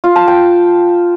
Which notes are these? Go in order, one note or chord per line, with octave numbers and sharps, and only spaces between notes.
F4
A5
G5